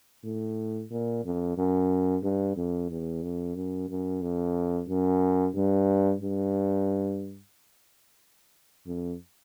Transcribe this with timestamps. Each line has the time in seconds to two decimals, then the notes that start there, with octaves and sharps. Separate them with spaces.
0.24 A2
0.91 A#2
1.25 F2
1.57 F#2
2.23 G2
2.56 F2
2.90 E2
3.23 F2
3.55 F#2
3.89 F#2
4.22 F2
4.88 F#2
5.54 G2
6.21 G2
8.86 F2